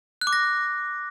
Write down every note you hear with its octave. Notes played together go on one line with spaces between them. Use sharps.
F#6
D6
A#6